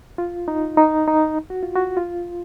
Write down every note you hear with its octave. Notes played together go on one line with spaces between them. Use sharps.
F4
D#4
D#4
D#4
F#4
F4
F#4
F4